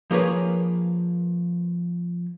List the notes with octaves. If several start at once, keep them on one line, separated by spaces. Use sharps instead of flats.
F3 A#3 G#4 A#4 B4 C#5